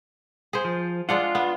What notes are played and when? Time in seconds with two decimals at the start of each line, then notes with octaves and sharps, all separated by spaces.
0.53 G#4 C5
0.65 F3
1.09 G#3 D4 F4 F#5
1.35 B3